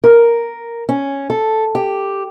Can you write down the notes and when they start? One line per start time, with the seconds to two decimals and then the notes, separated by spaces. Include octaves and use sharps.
0.04 A#4
0.89 C#4
1.30 A4
1.75 G4